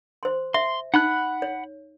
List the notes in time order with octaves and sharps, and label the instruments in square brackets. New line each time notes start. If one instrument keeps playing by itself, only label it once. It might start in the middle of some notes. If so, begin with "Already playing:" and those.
[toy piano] C5 C6
[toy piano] E5 [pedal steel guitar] C6
[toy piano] D#4 [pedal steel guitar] F#5 B5 F#6
[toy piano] C#5